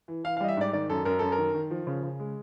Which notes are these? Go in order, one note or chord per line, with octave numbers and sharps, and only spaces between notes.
E3
E3 F5
F5
G3 D#5
E5
G#2 D5
D#3 D5
F#2 A4
F#2 A#4
F#2 A4
A#4
D#3
D#3
F3
C#3
C#3
G#3